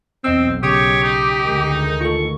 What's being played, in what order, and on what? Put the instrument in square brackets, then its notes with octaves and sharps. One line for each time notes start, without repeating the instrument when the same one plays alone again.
[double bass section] B1 [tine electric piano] E2 D#5 E6 [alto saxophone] C4
[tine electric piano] C#3 D#6 G6 [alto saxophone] G4 [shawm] C#5
[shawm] D#4
[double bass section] D2 D#3 G#3
[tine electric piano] F4 A4 [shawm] C#6